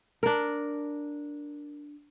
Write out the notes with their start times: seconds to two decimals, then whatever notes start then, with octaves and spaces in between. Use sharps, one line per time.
0.23 D4 A#4